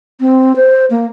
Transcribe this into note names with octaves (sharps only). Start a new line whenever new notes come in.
C4
C5
A#3